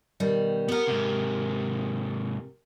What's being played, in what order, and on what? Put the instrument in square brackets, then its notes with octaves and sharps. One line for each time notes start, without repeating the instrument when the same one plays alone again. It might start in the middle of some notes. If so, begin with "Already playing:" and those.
[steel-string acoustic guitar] B2 D#3 G3
[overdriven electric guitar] B3 F#5 [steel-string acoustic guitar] G4 A#4
[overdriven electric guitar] G#2 C3